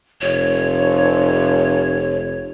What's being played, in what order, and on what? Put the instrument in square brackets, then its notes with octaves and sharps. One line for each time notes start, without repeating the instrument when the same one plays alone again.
[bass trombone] F1 [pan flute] C#5